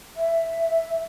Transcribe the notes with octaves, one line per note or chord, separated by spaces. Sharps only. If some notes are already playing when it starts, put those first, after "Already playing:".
E5